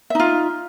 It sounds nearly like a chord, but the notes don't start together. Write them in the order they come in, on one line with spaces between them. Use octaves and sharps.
E5 D#4 F4